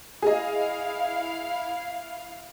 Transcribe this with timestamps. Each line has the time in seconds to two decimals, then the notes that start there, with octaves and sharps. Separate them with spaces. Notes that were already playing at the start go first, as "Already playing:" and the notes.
0.22 E4 G#4 D#5 F5